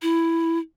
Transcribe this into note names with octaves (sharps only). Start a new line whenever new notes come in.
E4